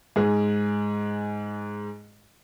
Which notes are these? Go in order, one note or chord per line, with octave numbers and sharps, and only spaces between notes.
G#2 G#4